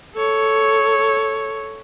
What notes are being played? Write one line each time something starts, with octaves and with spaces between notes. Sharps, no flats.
A4 C#5